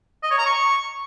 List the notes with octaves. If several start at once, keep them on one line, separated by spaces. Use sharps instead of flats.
D#5
C#5
A#5
C#6